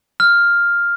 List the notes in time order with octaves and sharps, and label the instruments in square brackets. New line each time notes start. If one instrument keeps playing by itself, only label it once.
[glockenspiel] F6